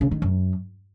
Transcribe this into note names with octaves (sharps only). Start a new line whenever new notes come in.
C#3
D#3
F#2